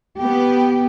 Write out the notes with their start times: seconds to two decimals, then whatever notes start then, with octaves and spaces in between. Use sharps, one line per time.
0.18 B3 G4